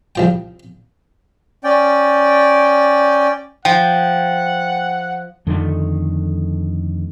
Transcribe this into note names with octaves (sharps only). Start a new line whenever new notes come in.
C2 F3 G5
C#4 D5 G5
F3 F#5 G5
F2 D3 D#3 A3